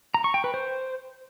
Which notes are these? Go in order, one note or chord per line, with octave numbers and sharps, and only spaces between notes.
A#5
C#6
G5
B4
C5